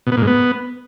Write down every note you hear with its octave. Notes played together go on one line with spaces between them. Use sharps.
B2
B3
A#2
G#2
B3